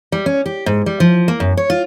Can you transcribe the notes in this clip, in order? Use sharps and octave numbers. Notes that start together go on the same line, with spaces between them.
G3
C#4
G4
G#2
G3
F3
A#3
F#2
C#5
F4